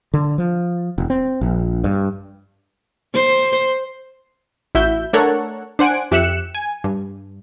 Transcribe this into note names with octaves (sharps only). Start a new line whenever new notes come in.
D3
F3
E1
C4
A#1
G2
C5
A1 E4 F#4 E5 G6
A3 D4 A4 A#4 C#5 F#5
D4 C5 F#5 G#5 D7
F2 G4 E5 F#6 C#7 E7
G#5
G2